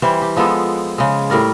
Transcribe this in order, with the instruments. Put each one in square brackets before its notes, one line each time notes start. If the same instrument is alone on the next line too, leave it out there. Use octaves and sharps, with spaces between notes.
[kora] E3 G3 C5
G4
F3 G#3 B3 A4
C#3 G#3
A2 G3 A#4 D5